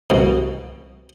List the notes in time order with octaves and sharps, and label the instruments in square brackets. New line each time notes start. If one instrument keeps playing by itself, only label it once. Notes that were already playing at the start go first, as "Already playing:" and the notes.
[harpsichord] C2 B2